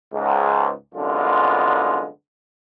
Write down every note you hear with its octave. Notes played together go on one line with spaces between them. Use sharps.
C#2 G#2
C2 F#2 D3 G#3 B3 F4